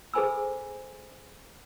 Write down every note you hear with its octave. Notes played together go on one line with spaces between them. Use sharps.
G#4 A4 C5 G#5 B5 E6